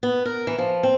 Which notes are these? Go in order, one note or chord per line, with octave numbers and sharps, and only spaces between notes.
B3
A#4
E3
F3
C4